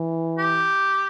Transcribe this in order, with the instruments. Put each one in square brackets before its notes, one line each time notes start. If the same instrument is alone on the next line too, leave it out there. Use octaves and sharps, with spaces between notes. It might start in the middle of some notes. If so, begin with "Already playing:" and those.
Already playing: [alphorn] E3
[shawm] G4